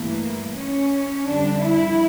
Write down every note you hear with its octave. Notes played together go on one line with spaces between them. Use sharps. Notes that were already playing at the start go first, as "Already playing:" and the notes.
Already playing: G2 E3 A3 A#3
C#4
F2 D3 G3 D4
E4